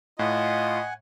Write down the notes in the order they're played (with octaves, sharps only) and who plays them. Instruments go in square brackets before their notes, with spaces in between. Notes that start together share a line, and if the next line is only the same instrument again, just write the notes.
[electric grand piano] A2 [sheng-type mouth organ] F4 [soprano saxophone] D#5 [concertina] F#5 G#5